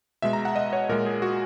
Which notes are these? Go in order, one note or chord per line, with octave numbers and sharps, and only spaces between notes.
B2 G#3 E5
A#5
F#5
D#5
C#5
A#2 G#3 A#4
G#4
F#4